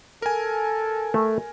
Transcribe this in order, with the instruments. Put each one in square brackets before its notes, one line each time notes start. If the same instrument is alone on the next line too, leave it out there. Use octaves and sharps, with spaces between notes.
[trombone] A4 [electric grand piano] A#4 G#5
[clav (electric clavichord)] A3